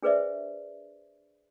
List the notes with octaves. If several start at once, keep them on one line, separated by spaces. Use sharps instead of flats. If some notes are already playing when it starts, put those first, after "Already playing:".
D4 G#4 B4 C5 D5 E5